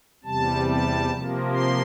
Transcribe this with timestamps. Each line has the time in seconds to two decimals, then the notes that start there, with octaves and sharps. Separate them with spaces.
0.24 E2 C3 G3 A5
0.67 A5
1.11 C3 F3 A#3
1.53 C6